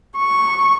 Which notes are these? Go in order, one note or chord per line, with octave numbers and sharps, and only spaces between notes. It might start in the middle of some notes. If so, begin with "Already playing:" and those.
C#6